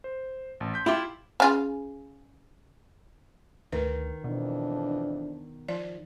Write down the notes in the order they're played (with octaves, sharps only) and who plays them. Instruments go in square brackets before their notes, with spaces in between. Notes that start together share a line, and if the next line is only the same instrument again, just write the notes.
[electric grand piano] C5
A1 A5
C6 G6 B6
[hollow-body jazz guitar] E4 F4 G4 [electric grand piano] G5 C6 D6
[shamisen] C#3 F4 G#4
[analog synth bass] D2 [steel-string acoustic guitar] D#3 [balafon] B4
[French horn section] F2 E3 D4 [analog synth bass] B2
[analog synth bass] F3 [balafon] D5